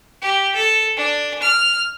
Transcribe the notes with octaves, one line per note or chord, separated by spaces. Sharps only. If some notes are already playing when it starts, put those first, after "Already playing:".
G4
A4
D4
F6